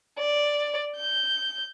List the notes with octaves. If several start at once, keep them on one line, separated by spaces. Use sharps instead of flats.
D5
G6